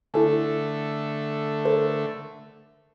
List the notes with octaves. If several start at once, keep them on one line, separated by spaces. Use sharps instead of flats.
D3 A3 E4 A4 G#5
A4 A#4 C5